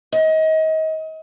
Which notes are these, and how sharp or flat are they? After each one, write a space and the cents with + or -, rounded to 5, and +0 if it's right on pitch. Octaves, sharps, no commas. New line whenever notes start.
D#5 +30